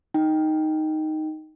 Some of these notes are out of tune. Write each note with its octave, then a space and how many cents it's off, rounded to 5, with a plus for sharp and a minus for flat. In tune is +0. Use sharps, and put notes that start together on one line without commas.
D#4 +0 G5 +0